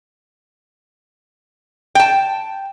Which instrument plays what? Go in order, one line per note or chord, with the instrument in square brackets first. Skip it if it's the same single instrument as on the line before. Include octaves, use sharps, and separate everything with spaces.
[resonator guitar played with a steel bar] G5 A5